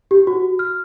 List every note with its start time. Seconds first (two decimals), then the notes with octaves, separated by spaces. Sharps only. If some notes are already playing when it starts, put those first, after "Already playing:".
0.11 G4
0.27 F#4
0.59 F6